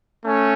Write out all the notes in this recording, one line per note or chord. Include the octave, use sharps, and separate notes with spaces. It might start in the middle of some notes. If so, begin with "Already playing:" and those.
A3 C#4